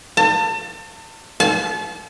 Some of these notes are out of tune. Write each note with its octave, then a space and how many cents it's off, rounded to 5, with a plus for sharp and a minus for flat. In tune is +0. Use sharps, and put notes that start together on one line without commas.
A5 +35
A5 -35